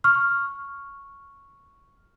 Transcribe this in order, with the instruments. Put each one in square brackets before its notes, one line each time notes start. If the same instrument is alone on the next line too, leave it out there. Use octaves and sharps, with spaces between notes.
[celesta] C#6 F6